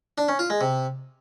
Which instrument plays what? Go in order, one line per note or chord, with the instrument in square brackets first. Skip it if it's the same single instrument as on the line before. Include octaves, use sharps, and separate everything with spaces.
[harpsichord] D4
C#4
F4
G#3
C3